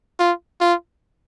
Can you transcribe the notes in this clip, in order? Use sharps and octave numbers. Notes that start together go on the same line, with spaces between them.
F4
F4